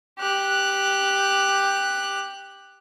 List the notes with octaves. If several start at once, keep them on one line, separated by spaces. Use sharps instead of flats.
G4 F#6